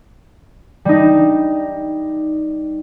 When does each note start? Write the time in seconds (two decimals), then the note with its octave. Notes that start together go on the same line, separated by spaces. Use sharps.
0.85 G3 D#4